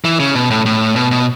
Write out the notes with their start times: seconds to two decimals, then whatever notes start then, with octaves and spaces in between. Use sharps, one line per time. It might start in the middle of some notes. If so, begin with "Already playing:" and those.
0.05 E3
0.20 C#3
0.35 B2
0.50 A2
0.66 A2
0.96 B2
1.11 B2